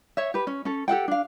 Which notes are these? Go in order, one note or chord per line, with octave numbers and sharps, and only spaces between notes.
C#5 E5
G4 B4
C#4
C#4 A4
G4 A4 F#5 G5
D4 F5